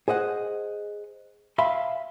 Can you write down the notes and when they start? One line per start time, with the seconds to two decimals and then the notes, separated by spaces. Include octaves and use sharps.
0.08 G#4 C5 D#5 F#5
1.58 E5 F5 G#5 B5 C6